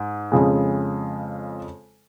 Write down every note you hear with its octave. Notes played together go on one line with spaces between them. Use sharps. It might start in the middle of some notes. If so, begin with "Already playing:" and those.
Already playing: G#2
F2 C#3 G#3